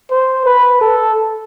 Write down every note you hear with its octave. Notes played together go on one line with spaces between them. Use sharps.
C5
B4
A4